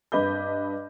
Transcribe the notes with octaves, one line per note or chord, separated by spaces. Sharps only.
G2 B4 D#5 B5 D6 G6